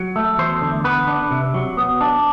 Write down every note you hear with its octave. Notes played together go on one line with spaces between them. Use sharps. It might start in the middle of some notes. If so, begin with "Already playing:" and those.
Already playing: F#3
A3
E2 C5
D3
B3 B4
D4
C3
F#3
B3
D4